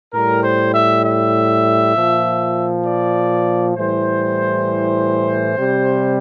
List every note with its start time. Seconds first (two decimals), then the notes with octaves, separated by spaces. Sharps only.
0.13 A2 G3 A#4
0.43 C5
0.74 E5
1.04 E5
1.95 A#2 F3
2.85 D5
3.76 A2 E3 G3 C5
5.56 C3 G3